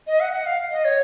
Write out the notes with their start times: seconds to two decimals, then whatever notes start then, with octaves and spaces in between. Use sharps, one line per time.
0.07 D#5
0.20 F#5
0.32 F#5
0.46 F5
0.71 D#5
0.85 C#5